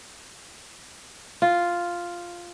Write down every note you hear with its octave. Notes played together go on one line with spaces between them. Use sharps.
F4